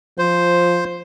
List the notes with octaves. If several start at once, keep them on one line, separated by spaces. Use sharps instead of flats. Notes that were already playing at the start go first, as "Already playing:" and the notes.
F3 C5